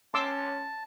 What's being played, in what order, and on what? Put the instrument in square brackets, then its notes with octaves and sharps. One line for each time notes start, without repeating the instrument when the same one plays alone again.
[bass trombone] C#4 [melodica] A5 [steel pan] C6 D6 E6